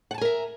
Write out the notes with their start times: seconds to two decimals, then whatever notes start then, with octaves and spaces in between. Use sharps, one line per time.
0.11 F#5
0.14 A5
0.18 G#5
0.21 A#4
0.25 E5